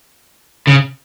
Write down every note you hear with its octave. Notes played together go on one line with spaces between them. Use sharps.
C#3